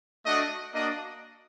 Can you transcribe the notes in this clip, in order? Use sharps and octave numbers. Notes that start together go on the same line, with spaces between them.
A3 D4 F#4 D#5
A#3 D4 F#4 D#5